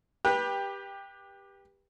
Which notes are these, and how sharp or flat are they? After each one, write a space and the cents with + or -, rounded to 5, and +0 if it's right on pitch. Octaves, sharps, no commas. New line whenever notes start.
G4 +15 B4 -25